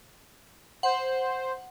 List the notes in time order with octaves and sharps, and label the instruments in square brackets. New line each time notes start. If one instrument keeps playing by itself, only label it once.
[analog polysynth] C5 [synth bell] F#5